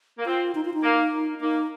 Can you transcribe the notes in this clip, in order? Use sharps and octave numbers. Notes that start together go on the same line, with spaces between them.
A#3
C4 F4
D#4
F4
D#4
A#3
A#3 D#4